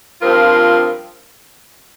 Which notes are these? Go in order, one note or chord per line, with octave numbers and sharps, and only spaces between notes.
G2 F3 C4 F4 A#4